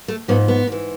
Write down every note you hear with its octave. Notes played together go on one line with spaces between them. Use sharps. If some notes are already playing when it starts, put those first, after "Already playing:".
A3
G#2 F3 B3
B3
G#2 E3